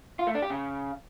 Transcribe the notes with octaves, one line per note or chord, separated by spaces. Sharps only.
F4
A3
D4
G4
C#3